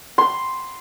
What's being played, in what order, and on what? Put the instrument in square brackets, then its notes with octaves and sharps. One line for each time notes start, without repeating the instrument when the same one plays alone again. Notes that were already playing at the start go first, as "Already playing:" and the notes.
[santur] C6